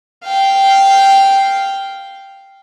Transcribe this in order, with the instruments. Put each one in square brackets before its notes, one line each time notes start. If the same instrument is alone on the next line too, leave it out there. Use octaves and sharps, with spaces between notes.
[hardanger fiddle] F5 G5